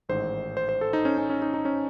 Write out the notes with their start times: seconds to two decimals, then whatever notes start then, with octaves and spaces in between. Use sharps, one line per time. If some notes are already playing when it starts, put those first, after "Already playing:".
0.09 A1 G#2 D#3 C5
0.57 C5
0.69 C5
0.81 A4
0.93 D#4
1.05 C#4
1.18 C#4
1.30 C#4
1.42 D#4
1.54 D#4
1.65 C#4